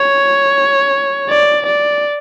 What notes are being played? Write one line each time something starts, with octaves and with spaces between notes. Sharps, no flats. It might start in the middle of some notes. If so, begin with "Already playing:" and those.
Already playing: C#5
D5
D5